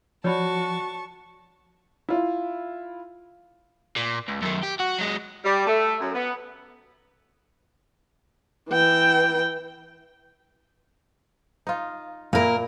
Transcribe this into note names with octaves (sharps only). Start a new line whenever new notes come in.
F3 F#4 C#5 D5 A5 B5 C#6
E4 F4
A#2
C#2
F#2 D#3
G4
F#4
F#3 G#3
G3
A3
F#2
B3
E3 G5
D#4 F4
A#2 A#3 E4 A#4